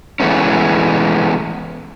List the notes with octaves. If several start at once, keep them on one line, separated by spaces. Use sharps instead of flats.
E3 G#3 A3 B3 C#4